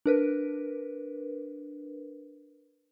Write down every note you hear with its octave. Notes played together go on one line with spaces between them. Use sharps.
D4 A#4 B4